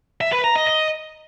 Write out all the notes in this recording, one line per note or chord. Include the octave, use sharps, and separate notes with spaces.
E5
B4
A#5
D#5
D#5